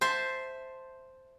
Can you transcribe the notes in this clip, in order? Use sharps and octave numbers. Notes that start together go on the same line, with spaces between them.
C5 E5 A5 C6